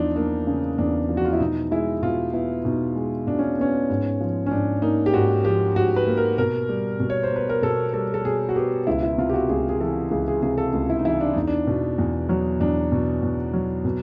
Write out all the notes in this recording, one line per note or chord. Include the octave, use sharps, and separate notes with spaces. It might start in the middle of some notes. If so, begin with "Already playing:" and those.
Already playing: E2 F3 D4 D#4
A#3 D4
C#3
E2 D4
F3
F#4
F4
E4
B2 D#4
G#3 E4
B2 F4
B3 E4
B2 D#4
G#3
B2 D4
C#4
B3 C#4
G#2
F3
C#4
G#2 D4
A#3 D#4
G4
G#2 F#4
F3 G4
G#2 F#4
B4
A#3
A#4
B2 A#4
G3
B2
C#5
C5
B3 B4
A#4
B2 A4
G3 A4
A4
B2 G#4
F#4
B3 G4
C#2 E4
E4
C3 F4
G4
F#4
C#2 G#4
G#4
E3 A4
C#2 G#4
G#4
C3 G#4
A4
C#2
E4
D#4
E3 E4
D4
E2 D#4
D4
B2
E2
F#3
E2 D4
B2
E2
F#3
B2